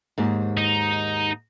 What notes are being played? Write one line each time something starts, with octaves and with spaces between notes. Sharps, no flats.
D#2 G#2
D#4